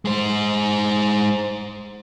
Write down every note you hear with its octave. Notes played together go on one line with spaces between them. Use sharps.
G#3 C5